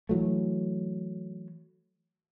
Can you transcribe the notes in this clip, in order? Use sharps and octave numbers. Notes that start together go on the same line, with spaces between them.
E3 F#3 A3